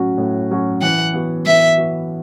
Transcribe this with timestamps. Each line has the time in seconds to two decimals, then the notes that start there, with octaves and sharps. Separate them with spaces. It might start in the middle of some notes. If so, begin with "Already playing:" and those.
Already playing: A2 F#3 C#4 F#4
0.18 A2
0.50 F#3 C#4 F#4
0.82 E3 F#5
1.13 B3 F#4
1.46 E3 E5
1.78 B3 F#4